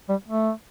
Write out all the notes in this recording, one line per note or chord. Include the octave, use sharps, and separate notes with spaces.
G3
A3